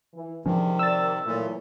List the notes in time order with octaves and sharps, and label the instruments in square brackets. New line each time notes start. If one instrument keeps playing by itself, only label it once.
[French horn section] E3
[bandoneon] C3 D#3 [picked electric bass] F3 C#4 [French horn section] G#3 D4
[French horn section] A#4 D5 [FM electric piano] E6 A6
[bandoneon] A#2 [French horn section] E3 F#3 A3